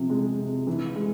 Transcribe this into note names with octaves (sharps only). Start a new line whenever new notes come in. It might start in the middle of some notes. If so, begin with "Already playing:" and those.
Already playing: C3 F3
G#3
C3
E3
G#3